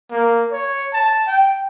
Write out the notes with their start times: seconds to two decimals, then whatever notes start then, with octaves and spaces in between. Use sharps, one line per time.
0.11 A#3
0.52 C#5
0.93 A5
1.27 G5